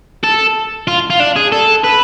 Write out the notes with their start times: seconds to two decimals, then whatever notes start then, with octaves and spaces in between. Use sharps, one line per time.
0.24 A4
0.87 F4
1.10 F4
1.20 D4
1.36 G#4
1.52 A4
1.84 B4